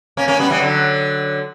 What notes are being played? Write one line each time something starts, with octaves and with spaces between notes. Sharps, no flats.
A#3 C#4
A#3 C#4
G3 B3
E3 G3
D3 F#3